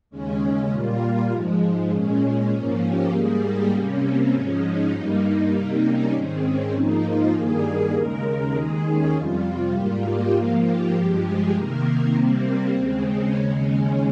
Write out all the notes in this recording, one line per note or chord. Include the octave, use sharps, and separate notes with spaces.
D#2 C#3 G#3 C#4
C#4
A#2 G3 A#3 F4
G#2 F3 G#3
A#2 G#3 C#4
C#4
G#2 F3 A#3
G4
G#2 G3 A#3 G#4
G4
C3 G3 A#3 C#4
C4
G#2 F3 G#3 C#4
D#4
G2 G3 A#3
C3 G3 A#3
C#4
G#2 D#3 G#3 C4
C#4
G#2 F3 A#3 D#4
F4
G2 D#3 G3 A#3 G#4
D#2 C#3 G#3 A#4
D#2 D#3 G#3 G#4
C#4
F2 C3 G3 F4
G#2 G3 A#3 F4
G4
G#2 F3 A#3 F4
G4
G2 F3 G#3
G#4
C3 D#3 A#3 A#4
A#4
C3 G3 A#3 C4
D#2 C#3 G#3 C4
C#4
D#2 C#3 G#3